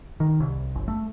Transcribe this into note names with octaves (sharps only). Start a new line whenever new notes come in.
D#3
C2
G1
A3